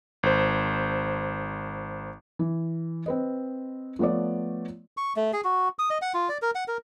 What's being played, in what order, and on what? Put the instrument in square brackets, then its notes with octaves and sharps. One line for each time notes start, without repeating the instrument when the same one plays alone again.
[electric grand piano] G#1 C5
[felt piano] E3
C4 B4 D#5
F3 A3 B3 C#5 D5
[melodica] C#6
A3
G#4
F#4
D#6
D#5
F#5
F4
D5
A#4
F#5
A#4